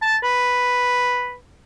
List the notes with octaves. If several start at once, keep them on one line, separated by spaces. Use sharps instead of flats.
A5
B4